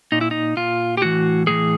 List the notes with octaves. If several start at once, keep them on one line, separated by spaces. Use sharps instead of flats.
A#2 D#4
E4
D#4
A#2 F4
G4
A2 E3 F#4
A2 E3 G#4